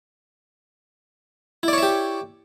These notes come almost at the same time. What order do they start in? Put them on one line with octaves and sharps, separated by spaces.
E4 D5 C#5 E5 G4